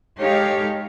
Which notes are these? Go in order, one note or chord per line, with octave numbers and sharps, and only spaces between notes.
G#3 D#4 G4 A4 C#5 F5